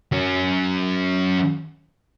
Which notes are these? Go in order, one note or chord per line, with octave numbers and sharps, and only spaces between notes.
F#3 C#4